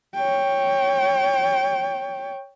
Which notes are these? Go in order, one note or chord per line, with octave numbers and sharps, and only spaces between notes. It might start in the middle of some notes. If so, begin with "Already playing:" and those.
C#5 G5